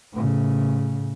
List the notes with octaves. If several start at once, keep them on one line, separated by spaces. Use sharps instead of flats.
A2 C#3